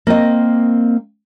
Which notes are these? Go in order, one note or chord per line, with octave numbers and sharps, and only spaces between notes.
A#3 C4 D#5